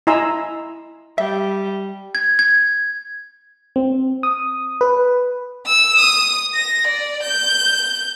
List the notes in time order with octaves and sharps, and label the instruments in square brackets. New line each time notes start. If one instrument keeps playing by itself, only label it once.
[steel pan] E4 D#5 G#5 A#5 C6 E6
[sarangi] G3 [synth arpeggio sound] E5
[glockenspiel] G#6
G#6
[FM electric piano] C4
D#6
B4
[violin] E6
D#6
A#6
D5
G6